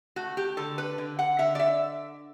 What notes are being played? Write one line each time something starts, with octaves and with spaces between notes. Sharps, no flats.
A3 F#4
G4
D3 A4
B4
D3
F#5
D3 E5
D5
E5